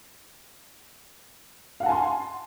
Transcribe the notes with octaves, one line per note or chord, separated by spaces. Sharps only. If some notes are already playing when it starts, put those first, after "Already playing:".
F5 F#5 G#5 A5 C6